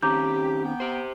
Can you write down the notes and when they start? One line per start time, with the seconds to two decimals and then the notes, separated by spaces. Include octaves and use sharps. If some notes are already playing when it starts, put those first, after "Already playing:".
0.02 D#3 C4 C#4 G4 A#5 D6 G6
0.64 B3 G5
0.80 G4 C5